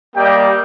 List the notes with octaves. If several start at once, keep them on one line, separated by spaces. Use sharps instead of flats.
G3 A#3 G4 D#5 G5